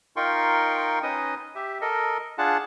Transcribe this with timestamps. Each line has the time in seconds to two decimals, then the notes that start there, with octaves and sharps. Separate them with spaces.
0.16 D#4 F4 A#4 G5 C6 C#6
1.03 C#4 D#4 B4 D#5 D#6
1.55 G4 E5
1.81 A4 A#4 D#5
2.38 D4 F4 G#4 F#5 A5